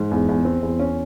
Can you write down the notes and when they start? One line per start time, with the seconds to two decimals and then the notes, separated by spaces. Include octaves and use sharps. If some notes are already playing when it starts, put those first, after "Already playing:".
Already playing: G#2
0.11 E2
0.29 E2
0.45 C4
0.63 E2
0.79 C#4